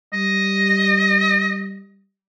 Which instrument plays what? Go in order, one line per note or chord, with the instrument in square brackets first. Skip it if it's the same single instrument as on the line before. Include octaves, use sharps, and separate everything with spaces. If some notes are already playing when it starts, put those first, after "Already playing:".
[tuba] G3 [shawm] D#5